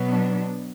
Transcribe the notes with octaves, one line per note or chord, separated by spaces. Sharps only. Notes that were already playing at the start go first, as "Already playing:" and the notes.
Already playing: B2 F#3 B3
D4